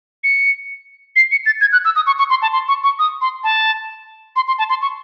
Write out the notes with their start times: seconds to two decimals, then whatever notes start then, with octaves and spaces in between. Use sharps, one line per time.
0.24 C#7
1.16 C7
1.31 C#7
1.46 A6
1.61 G#6
1.72 F#6
1.85 E6
1.96 D#6
2.07 C#6
2.19 C#6
2.30 C6
2.42 A5
2.53 C6
2.68 C#6
2.83 C#6
2.99 D#6
3.21 C6
3.44 A5
4.36 C6
4.47 C6
4.59 A5
4.69 C6
4.82 C#6